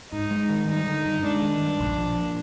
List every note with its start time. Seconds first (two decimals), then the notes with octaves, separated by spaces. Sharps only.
0.12 G#2 D#4
0.31 G#3
0.49 D#3
0.68 G3 D#4
0.87 D3
1.05 G2
1.24 G#3 D4
1.42 D#3
1.61 G2
1.80 A#1
1.98 F3
2.17 A#2